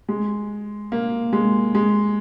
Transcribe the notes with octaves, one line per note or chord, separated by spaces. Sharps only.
G#3
A#3
G#3
G#3